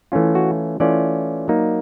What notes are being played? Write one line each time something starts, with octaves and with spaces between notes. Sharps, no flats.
E3 A3 C#4 F4
F#4
E3 A3 C#4 F4 D5
F#3 A#3 D#4